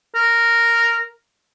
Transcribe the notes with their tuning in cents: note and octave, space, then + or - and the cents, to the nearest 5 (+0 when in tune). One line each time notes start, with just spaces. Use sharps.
A#4 -5